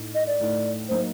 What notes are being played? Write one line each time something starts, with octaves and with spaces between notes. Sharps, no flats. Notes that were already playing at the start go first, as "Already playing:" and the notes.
Already playing: A2 A3 D#4
D#5
D5
A2 A3 D#4
F#3 A#3 D#4 C5